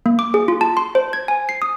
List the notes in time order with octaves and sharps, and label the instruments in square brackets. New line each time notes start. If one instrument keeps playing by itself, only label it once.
[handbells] A#3
D6
G#4
F4
A5
C6
C5
G#6
G#5
C7
D#6